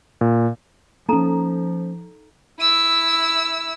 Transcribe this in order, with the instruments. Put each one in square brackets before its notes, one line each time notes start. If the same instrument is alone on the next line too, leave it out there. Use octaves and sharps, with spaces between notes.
[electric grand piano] A#2
[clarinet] F3 [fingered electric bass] A#3 C#4 [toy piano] D#4 A4 A#5
[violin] E4 E6